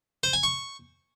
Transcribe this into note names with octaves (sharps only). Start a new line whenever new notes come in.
C5
G#5
C#6